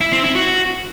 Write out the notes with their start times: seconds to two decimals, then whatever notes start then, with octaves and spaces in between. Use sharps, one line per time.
0.01 E4
0.12 C4
0.24 E4
0.35 F#4